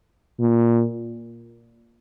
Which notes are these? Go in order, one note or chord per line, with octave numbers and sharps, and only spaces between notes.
A#2